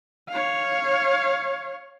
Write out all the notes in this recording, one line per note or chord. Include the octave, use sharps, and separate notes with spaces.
C#5 F5